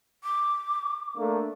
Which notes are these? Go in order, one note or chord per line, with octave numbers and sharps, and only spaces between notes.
D6
A3 A#3 D4